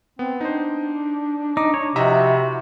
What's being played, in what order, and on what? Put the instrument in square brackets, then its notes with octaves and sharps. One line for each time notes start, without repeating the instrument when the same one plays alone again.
[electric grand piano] B3 [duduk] C4
[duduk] D4 [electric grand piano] D#4 C5
[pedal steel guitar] D#4 [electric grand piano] D6
[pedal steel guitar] C#5
[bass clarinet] C3 [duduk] F3 [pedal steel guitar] E4 F#4 [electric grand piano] D#5 E5 A#5